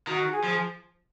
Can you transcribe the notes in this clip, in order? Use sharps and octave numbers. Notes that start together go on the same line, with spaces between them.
D#3 F#4
G#4
F3